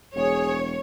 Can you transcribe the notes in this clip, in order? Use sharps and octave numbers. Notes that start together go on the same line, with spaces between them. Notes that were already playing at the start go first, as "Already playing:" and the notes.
E1 G#4 C#5